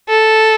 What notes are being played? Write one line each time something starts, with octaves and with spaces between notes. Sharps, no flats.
A4